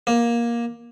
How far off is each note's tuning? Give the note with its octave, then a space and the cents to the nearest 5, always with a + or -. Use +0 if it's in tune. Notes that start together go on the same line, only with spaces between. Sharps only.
A#3 +15